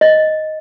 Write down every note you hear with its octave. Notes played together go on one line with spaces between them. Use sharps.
D#5